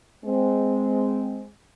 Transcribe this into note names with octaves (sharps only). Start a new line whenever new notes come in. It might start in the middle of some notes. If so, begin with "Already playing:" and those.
G#3 C4